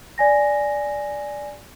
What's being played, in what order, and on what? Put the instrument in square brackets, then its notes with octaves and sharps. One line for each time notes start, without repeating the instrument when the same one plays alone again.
[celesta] D5 G#5 A#6